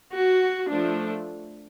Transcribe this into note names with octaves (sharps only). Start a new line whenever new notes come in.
F#4
F3 A3 D4